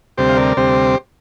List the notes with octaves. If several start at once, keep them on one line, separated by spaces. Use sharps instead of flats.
D2 C3 G3 C4 G4 C5
F5
A#4 D5
D2 C3 G3 C4 G4 C5